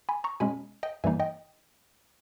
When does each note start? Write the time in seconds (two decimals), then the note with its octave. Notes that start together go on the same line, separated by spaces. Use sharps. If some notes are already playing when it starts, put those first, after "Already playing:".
0.09 G#5 B5
0.24 A#5 C#6
0.40 B2 G#3 C#4 G#5 B5
0.83 D#5 G5
1.04 G2 E3 G3 A#3 D#4 E5 G#5
1.20 D#5 G5